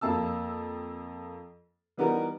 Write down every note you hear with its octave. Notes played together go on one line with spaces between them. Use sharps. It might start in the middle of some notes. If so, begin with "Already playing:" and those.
F2 A#3 A5 E6
E3 G3 B3 D#4 F#4 A#4